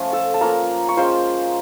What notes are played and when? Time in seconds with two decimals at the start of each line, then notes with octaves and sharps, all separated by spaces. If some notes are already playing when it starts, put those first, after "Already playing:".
Already playing: F3 A3 C#4 F4
0.13 A4 A5
0.34 A5
0.41 A#3 C#4 F4 A#4 A#5
0.89 C#6
0.97 G#3 C#4 F4 C5 C6